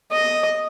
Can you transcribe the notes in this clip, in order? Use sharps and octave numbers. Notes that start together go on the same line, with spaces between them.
D#5